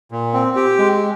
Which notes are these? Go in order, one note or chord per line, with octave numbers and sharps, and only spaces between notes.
A#2
C4
G4
G#3